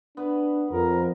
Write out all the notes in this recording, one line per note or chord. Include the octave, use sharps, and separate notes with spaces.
B3 D4 B4
F2 F3 A#4